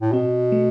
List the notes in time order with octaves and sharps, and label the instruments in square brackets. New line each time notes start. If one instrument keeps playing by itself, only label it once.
[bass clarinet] A2
[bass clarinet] B2 [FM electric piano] C4
[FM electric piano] A3